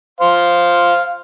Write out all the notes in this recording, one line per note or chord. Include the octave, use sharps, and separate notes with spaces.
C5 F5